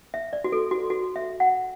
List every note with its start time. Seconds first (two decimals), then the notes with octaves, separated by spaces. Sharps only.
0.14 E5
0.33 D5
0.44 F#4
0.52 A4
0.71 F#4
0.90 F#4
1.16 E5
1.40 F#5